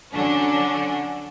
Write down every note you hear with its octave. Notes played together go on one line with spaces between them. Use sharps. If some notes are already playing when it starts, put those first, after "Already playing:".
D3 F#3 C#4 D4